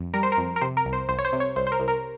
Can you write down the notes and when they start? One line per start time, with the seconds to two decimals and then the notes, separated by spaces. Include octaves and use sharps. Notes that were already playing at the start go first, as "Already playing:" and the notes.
Already playing: F2
0.14 G3 A#4
0.23 C5
0.32 A#4
0.37 F2
0.56 A#4
0.61 C3 C5
0.77 A#4
0.85 C2
0.93 C5
1.08 C2 C5
1.19 C#5
1.25 C5
1.33 C3
1.40 C#5
1.56 C2 C5
1.67 C5
1.72 A#4
1.80 C2
1.88 A#4